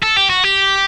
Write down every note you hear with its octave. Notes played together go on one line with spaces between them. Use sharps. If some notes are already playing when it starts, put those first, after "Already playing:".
A4
G4
F#4
G4